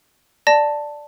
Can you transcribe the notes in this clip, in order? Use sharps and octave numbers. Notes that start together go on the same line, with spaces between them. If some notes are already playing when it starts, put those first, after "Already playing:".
D5 A5 A#6